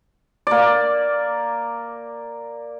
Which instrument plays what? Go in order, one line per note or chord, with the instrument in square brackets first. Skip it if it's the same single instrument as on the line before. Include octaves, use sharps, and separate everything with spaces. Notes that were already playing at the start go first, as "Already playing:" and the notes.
[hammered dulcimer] A#3 D5